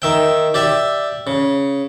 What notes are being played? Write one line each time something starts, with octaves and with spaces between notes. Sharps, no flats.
D#3 E5 G5
G4 D5 E5
C#3